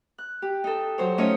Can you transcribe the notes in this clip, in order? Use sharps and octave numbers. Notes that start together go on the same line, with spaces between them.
F#6
G4
D#4 A4
F#3 C5 C#5
A3 C#4 D#4 F4 C#5 D#5